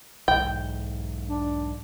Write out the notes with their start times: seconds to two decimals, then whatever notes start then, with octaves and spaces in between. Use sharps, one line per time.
0.28 B1 E2 G#2 G5
1.28 D4